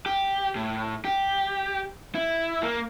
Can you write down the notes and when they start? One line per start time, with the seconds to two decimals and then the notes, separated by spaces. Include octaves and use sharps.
0.06 G4
0.55 A2
1.05 G4
2.15 E4
2.63 A#3